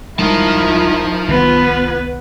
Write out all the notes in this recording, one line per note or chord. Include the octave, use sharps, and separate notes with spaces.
D1 D#3 G3 G#3 E4 F4 A5
C2 D#3 B3 B4